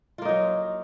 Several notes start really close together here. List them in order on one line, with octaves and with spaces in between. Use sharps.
F4 A#3 D#4 F#3